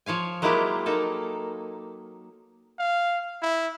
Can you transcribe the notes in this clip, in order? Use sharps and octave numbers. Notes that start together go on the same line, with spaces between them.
F3 C#5 F5 G#5
F#3 G#3 A#3 E4 F4 G4
A#3 D#4 A4
F5
E4